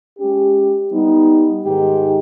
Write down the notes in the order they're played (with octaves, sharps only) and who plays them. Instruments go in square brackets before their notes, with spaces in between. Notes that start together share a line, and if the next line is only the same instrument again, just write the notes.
[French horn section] G#3 C#4 G4
G3 B3 D#4
G#2 D#3 G#3 D#4 G4